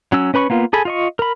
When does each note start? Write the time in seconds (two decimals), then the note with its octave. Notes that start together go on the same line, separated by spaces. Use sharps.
0.12 F#3 C#4 E6
0.34 C#4 B4 B5 C#6
0.50 A#3 B3 F4
0.73 G#4 A4 G#5 B5
0.85 F4 D#5 C#6
1.19 A#4 B5